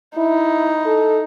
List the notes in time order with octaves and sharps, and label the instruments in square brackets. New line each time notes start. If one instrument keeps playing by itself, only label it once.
[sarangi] D#4 [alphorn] E4
[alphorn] A4